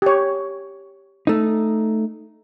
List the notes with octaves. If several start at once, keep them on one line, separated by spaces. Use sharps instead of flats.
G4 C#5
A3 D#4